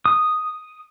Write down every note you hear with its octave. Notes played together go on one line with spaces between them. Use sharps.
D#6